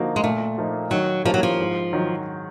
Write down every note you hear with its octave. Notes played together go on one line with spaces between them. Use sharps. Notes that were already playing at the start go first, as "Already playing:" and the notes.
Already playing: D3 F3 A#3 D#4 F#4
G#3
A#2 A3
F3 A#3 D#4
D#3 F#3
F3 G3 A#3 C#4 E4
F#3
F3
G#2
D#3 F#3